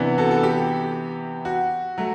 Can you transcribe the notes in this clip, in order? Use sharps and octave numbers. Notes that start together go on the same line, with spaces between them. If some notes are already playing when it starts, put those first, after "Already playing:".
Already playing: C3 E3 B3 D4
F#4 A4
F#4 A4
G4
F#4
F#3 A3